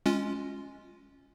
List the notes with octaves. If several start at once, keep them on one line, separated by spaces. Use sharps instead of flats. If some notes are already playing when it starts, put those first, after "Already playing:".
G#3 C#4 F4